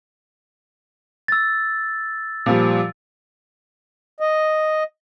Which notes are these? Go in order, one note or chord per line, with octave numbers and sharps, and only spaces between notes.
E6 A6
A#2 F3 G3
D#5